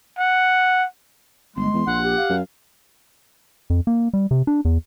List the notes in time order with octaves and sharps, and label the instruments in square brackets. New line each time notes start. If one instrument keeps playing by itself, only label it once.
[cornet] F#5
[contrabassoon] G1 [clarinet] G#3 [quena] C6
[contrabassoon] E2
[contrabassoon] A#1 [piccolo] F#5
[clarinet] G4
[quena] F5
[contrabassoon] F#2
[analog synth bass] F2
A#3
G3
C3
D4
E2